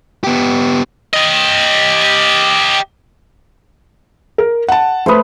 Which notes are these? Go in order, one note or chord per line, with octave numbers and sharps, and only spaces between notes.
B3 G4
G4 D#5
A#4
F#5 A5
A3 B4 C5 D#6